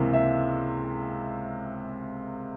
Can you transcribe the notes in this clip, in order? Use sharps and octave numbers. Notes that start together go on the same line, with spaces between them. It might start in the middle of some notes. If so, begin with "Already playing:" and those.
Already playing: C#2 C3 E3 A#3
E5